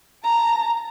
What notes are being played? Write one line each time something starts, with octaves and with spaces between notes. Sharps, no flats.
A5 A#5